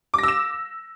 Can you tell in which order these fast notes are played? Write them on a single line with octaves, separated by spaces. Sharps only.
D6 A#6 E6 E7